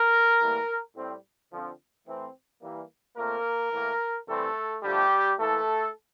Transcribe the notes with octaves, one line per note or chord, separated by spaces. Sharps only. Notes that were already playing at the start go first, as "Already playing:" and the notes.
Already playing: A#4
A2 E3 G3 A#3
A2 G3 C4
D3 F3 C4
A2 E3 A3 C4
E3 G3 A#3
A#2 A3 A#3 C4 A#4
A2 E3 A#3
C3 E3 G3 A3 C4 A4
D3 F3 G3 A3 G4
A2 E3 A3 A#3 A4